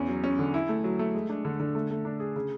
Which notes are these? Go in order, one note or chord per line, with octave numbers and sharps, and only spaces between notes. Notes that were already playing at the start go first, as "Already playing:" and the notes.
Already playing: E2 C#4
F#3
C#4
D3
E4
A3
F#3
A3
G#3
D4
D3
D3
A3
A3
D4
G#4
C#3